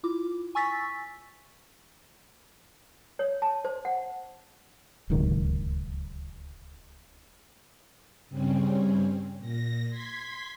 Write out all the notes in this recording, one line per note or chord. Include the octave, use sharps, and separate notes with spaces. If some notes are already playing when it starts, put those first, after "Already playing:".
E4 F4 D6
G#5 C#6 E6 A6 B6
C#5
A5
C5
F#5
D1 C#2 F#2 D#3
G2 C#3 G3 C4 C#4
A#2 A#6
C6 G#6 B6